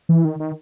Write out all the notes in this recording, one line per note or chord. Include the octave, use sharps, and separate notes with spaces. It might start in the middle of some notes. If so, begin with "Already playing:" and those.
E3
D#3
D#3